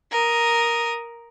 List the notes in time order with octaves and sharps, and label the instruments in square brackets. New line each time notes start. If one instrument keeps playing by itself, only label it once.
[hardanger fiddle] A#4 D#6